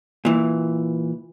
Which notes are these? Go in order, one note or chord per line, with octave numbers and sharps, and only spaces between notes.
A#2 E3